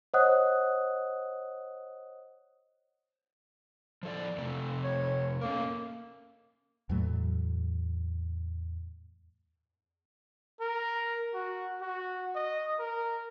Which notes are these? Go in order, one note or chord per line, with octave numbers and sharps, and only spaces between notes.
C5 C#5 D#5 F#5 D#6 F#6
F3 A4 D5
F2 C3 A3
C#5
A#3 C#4 A4 A#4
E2 A2 F#3 A3
A#4
F#4
F#4
D#5
A#4